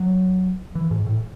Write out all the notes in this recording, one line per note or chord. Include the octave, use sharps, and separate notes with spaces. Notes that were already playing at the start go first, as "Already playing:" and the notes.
Already playing: F#3
E3
G#2
A2